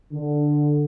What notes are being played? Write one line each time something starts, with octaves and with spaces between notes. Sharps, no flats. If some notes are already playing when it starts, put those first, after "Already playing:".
D3